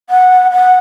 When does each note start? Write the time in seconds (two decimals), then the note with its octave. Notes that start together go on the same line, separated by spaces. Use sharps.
0.10 F#5
0.51 F#5